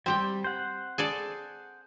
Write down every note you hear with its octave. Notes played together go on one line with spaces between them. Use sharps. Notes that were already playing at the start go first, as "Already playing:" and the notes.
G3 C4 G4 G5
C5 F#5
G#4 A4 D5